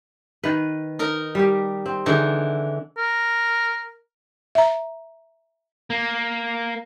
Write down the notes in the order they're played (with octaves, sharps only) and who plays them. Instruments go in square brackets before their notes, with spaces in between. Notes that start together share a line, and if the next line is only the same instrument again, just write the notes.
[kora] D#3 B4
[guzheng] D#4 A#4
[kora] G3 G4
C4
[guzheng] D3 E3 D4 [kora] D#4 G#4
[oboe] A#4
[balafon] E5 A#5
[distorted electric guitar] A#3